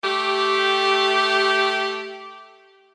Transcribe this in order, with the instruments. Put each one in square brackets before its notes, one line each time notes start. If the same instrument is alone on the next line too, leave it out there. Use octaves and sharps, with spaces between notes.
[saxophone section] A3 G4